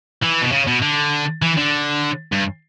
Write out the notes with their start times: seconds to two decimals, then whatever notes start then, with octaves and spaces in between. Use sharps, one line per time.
0.22 E3
0.41 B2
0.52 C#3
0.67 B2
0.82 D3
1.42 E3
1.57 D3
2.32 G2